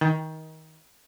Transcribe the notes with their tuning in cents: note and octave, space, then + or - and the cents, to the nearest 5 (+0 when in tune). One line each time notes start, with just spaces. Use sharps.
D#3 +25